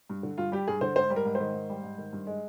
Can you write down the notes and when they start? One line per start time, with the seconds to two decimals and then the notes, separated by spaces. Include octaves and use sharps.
0.10 G2
0.23 D3
0.38 G2 F4
0.52 G3 G4
0.68 G2 G#4
0.81 D3 C5
0.96 G#2 C5
1.10 G3
1.16 A#4
1.25 G#2
1.35 C5
1.40 D#3
1.54 G#2
1.70 G3
1.83 G#2
1.98 D#3
2.13 G2
2.27 G#3